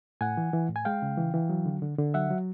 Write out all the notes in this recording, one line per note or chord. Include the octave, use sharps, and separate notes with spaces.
A2 F#5 G#5
E3
E3
A2
G#5
G#3 F5 G5
C#3
E3
E3
F#3
D3
D3
D3
F#3 E5 F#5
F#3